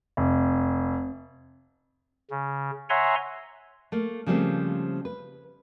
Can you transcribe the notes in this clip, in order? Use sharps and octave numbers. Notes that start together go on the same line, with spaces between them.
F1
C#3
C#5 E5 F#5 G#5 A#5 C6
A3 A#3
C#3 F3 G3 A3 A#3 C4
B4